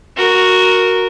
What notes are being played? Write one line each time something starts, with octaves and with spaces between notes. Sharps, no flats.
F#4 A#4